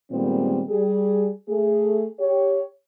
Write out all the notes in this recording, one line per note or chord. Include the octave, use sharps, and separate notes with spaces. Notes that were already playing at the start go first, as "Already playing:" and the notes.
A#2 D#3 G3 G#3 B3 C4
G3 G#4
A3 G#4
G4 C#5